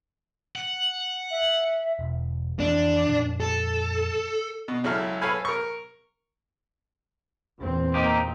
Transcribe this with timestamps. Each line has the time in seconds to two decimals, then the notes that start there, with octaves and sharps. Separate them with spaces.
0.56 F#5
1.31 E5
1.99 E1
2.60 F2 E3 F3 D4
3.07 F2 A#2
3.40 A4
4.68 B2
4.84 C#2 F#3 E4 A4 F6
5.21 A4 B4 C#5 F5 G#5 B5
5.45 A#4 C#6
7.59 E2 A#2 C4
7.94 A#3 D#4 G4